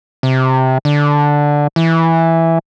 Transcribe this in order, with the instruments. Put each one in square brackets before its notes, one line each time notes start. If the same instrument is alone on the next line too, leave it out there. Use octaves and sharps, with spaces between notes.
[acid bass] C3
D3
E3